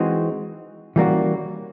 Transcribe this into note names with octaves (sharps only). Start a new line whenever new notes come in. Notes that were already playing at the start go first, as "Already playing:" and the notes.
Already playing: E3 G#3 C4 D#4 F#4
E3 G3 A#3 C#4 F#4